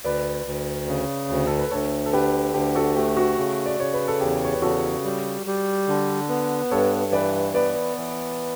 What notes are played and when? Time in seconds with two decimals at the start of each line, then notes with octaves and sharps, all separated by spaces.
0.04 D2 B4 D5
0.46 D2
0.87 C#3
1.29 D2
1.47 A4
1.59 B4
1.71 D2 A4 C#5
2.06 A4
2.13 D3 G4 B4
2.54 D2 G4
2.75 F#4 A4
2.96 A3 G4
3.17 F#4
3.38 C#3
3.66 D5
3.80 C#3 C#5
3.93 B4
4.08 A4
4.21 E2 G4
4.44 C#5
4.53 B4
4.62 C#3 F#4 A4
5.04 G3
5.46 G3
5.88 D3
6.29 B3
6.71 G2 A4 C#5
7.12 E3 B4 D5
7.54 B3 B4 D5
7.97 E3